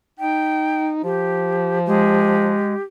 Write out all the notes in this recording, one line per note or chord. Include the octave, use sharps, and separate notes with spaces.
D#4 G5
F3 G4
G#3 G4